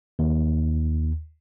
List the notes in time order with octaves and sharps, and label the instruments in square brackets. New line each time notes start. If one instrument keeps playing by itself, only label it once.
[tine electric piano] D#2